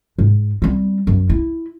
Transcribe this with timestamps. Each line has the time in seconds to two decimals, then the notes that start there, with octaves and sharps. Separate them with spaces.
0.18 G#2
0.62 G3 C4
1.07 F#2
1.29 E4